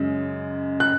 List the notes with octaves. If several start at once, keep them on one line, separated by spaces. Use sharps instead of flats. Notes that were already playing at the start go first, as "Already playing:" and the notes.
Already playing: F#2 C#3 G#3
F#6